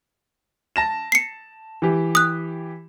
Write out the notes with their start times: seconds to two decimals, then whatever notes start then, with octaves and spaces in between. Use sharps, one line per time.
0.76 A5 A#6 E7
1.12 C7 C#7
1.82 E3 G4
2.15 D#6 F#6